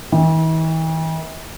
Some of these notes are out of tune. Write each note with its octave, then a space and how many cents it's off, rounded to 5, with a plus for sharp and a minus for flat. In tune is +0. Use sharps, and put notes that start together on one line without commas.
E3 -45